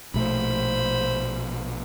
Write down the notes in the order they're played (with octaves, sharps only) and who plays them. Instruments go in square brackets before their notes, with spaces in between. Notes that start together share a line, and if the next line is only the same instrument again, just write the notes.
[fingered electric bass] A#1 B2 A3 [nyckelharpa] C5 B5